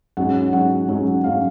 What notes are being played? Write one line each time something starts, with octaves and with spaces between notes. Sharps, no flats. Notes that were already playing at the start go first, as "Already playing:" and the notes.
G#2 F#3 C#4 F#5
G#2 F#3 C#4 F#5
G#2 F#3 C#4
G#2 F#3 C#4 F5